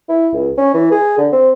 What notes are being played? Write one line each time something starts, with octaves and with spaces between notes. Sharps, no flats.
E4
C#2
C#4
E3
G#4
D3
C4